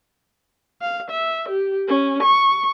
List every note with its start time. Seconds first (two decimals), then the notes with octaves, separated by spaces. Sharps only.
0.82 F5
1.11 E5
1.49 G4
1.88 C#4
2.23 C#6